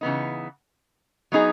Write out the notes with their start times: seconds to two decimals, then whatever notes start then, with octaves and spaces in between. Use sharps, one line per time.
0.01 C#3 E3 B3 D#4
1.32 F#3 B3 D#4 G#4